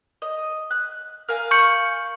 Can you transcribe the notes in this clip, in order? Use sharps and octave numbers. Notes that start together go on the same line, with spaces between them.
D#5
F#6
A#4 F5 G#5
C#6 G6 C#7